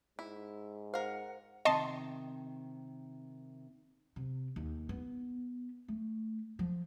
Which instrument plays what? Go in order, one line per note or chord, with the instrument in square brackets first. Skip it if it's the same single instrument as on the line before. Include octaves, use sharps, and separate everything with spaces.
[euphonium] G#2 [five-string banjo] E4
[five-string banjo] A#4 F5 [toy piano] C5 [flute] F#5
[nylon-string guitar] C3 D#3 C4 [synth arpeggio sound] D#5 A5 C6
[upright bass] C3
D#2
B3
A3
F3